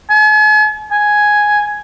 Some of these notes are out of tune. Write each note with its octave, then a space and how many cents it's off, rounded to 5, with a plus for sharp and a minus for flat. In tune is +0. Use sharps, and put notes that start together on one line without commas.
G#5 +45
G#5 +5